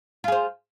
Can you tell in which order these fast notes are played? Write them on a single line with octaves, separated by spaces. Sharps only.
F4 G#4 C5